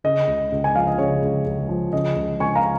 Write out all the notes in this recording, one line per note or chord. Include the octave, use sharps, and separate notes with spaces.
C#3 D#5
C#2
C#2
G#5
F3 F5
D#5
C#3 C#5
C#2
C#2
F3
C#3 D#5
C#2
C#2 G#5 C#6
F5 A#5